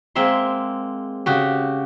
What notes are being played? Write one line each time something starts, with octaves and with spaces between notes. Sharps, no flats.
G#3 A#3 C4 E5 C6
C#3 F#4 G4